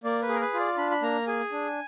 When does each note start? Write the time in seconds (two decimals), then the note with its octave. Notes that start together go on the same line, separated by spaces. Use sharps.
0.04 A#3 D5
0.22 B4
0.29 G#4
0.34 A#4
0.41 B4
0.54 F4
0.59 D5
0.78 D4 B5
0.91 B5
1.02 A#3 A#5
1.27 G#4 G#5
1.52 D4